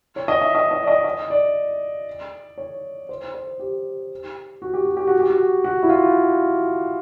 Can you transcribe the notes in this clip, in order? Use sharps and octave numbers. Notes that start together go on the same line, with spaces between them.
C#5
D#5
E5
D#5
D#5
D5
D#5
D#5
D5
C#5
C5
C5
G4
F#4
G4
F#4
G4
F#4
G4
F#4
F#4
E4
F4